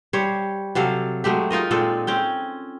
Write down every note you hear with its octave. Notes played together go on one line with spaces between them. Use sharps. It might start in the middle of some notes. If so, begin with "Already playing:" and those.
G3 C5 C#5
C3 F#3 A4 F5
F#3 G#3 A3 G4
D#4 F4 A#4 D#5
A#2 G#3 C4 A4
C4 C#4 G5